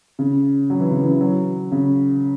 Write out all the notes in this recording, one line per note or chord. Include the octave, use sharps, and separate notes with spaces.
C#3
F#3
E3
C#3
E3
F#3
C#3